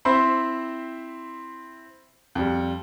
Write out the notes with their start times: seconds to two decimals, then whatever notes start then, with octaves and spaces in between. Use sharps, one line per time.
0.05 C4 E4 C5 B5 C6
2.35 F2 G3